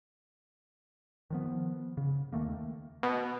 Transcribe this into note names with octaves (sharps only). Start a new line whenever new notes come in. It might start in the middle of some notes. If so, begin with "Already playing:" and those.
D#3 F3 B3
C#3
D#2 D#3 A3 A#3
B2